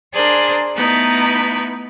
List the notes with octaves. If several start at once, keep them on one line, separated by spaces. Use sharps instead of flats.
D4 G#4 A#4 C5 D5
A3 B3 D#4 E4 B4